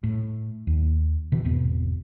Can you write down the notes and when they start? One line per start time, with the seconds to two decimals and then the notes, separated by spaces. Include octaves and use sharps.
0.04 A2
0.67 D#2
1.32 B2 D#3 E3
1.44 G#1 E2 B2 B3